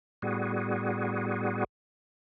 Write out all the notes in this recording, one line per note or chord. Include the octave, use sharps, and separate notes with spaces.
A2 G3 B3 F#4 G#4